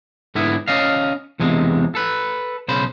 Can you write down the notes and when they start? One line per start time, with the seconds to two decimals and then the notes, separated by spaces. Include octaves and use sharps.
0.35 G#2 D3 B3 E4
0.68 C#4 D5 D#5 F5
1.40 E2 C3 G#3
1.95 A4 B4
2.68 B1 C#3 C5 B5